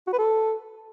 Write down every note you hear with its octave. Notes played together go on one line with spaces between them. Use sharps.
F#4
B4
A4